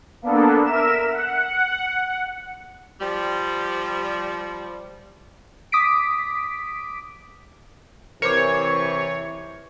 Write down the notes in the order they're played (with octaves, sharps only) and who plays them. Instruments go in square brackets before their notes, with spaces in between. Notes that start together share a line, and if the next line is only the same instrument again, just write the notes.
[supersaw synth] A#3 B3 D4 A4
A#4 E5 E7
F#5
[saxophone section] F3 G3
[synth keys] D6 D#6 B6 D7
[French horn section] C3 E3 [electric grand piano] A#4 C5 D6 [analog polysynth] C#5